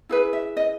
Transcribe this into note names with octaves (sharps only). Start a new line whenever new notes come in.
E4 G#4 B4
E5
D#5